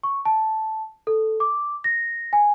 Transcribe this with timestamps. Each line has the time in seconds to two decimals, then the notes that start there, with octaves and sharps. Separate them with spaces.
0.03 C#6
0.25 A5
1.07 A4
1.40 D6
1.84 A#6
2.33 G#5